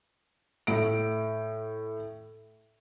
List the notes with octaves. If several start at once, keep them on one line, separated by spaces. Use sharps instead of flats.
A2 D7